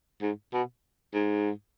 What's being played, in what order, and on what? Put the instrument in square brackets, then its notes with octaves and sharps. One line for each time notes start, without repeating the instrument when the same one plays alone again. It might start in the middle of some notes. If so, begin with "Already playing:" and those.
[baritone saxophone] G#2
B2
G#2